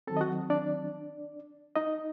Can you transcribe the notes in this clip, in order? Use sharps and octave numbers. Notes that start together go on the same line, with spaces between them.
D#3 F#3 C4 A4 A5
D#5
F#4 F#5
D4 D5
D#4 D#5